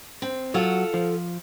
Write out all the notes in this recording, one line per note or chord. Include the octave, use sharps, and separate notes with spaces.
C4
F#3 F4 F#4 A4 F#5
F3